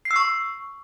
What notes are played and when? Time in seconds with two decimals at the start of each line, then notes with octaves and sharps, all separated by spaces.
0.05 C7
0.11 E6
0.16 C#6